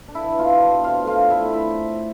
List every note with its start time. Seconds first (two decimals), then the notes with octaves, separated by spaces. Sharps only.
0.08 D4
0.15 E4 E5
0.23 E3
0.39 B2 F4 F5
0.53 D4
0.69 B2
0.84 C3 F4 F5
1.00 A3
1.07 F4 F5
1.15 D4
1.30 A2 E4 E5
1.45 C4
1.53 E4 E5